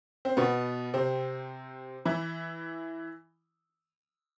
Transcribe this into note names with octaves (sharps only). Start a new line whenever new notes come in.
C4
B2 B3
C3 C4
E3 E4